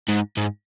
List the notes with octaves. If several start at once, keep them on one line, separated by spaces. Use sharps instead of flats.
G#2
G#2